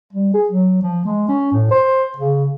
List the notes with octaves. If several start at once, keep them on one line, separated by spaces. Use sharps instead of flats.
G3
G#4
F#3
F3
G#3
C#4
A2
C5
C#3